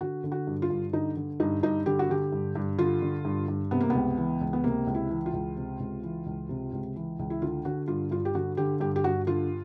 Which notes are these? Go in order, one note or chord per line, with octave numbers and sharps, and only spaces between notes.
D3 F#4
D3
F#4
G2
F4
G2
D3 D#4
D3
G2 D#4
G2 D#4
D3 G4
F#4
D3 G4
G2
G2
D3 F4
D3
G2
G2
C3 B3
A#3
C#2 B3
E3
C#2
B3
C3 A#3
C#2
E4
E3
F4
C#2
C3
C#2
E3
C#2
C3
C#2
E3
C#2
E4
D3 F4
D3 F#4
G2 F4
G2 F4
G4
D3 F#4
D3 G4
G2 G4
G4
G2 F#4
D3 F4